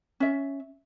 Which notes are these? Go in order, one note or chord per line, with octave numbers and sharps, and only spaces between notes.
C#4 E5